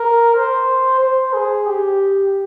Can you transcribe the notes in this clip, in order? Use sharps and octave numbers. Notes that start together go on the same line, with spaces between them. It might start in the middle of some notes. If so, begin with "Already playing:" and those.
Already playing: A#4
C5
C5
G#4
G4